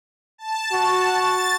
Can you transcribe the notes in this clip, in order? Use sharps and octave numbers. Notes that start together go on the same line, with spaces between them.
A5
F#4
A6